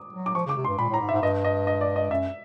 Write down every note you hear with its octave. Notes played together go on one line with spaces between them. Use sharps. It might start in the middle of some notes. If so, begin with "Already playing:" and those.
Already playing: D6 D#6
F#3
D6
F3 C#6
C#3 D6
C3
C6
G2
A#2 B5
A2 A#5
G#2
E5
G#2
G2 D#5
D#5
D#5
D5
D#5
F#2 E5